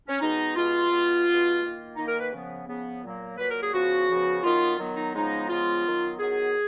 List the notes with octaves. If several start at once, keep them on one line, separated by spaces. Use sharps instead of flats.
C#4
B2 G#3 B3 D#4
B2 G#3 B3 F4
B2 G#3 B3
B2 G#3 B3
D#3 A#3
D#3 A#3 D#4
A#4
B4
C#3 F3 B3
C#3 F3 B3
A#2 F#3 A#3
A#2 F#3 A#3 B4
A#4
G#4
C#3 F3 B3 F#4
C#3 F3 B3
D#3 F#3 B3 F4
D#3 F#3 B3
D#4
C#3 F3 G#3 B3 D#4
C#3 F3 G#3 B3 F4
D#3 F#3 B3
D#3 F#3 B3 G#4